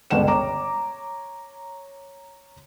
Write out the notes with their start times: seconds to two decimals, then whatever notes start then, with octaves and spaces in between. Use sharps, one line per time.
0.10 G1 C#2 B2 F#5 G5 E7
0.28 C#5 A#5 D6